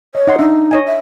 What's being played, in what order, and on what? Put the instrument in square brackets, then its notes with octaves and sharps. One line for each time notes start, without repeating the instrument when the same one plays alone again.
[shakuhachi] C#5 [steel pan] D#5
[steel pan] D#4 F#5 C6
[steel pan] D4 E5 [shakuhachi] D#4
[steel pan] C#5 D#5 G#5
[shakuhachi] E5